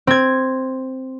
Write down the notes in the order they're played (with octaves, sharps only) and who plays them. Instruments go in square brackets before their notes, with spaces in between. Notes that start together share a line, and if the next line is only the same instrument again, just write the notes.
[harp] C4 G#6